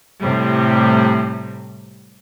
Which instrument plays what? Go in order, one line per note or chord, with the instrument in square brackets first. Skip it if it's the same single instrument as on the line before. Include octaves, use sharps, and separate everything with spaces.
[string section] A2 C3 G3